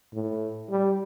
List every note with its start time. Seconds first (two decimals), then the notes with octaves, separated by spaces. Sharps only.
0.14 A2
0.70 G3